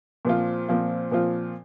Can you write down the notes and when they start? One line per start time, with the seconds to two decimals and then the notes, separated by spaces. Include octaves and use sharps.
0.25 A#2 F3 C4 F4
0.68 A#2 F3 C4 F4
1.11 A#2 F3 C4 F4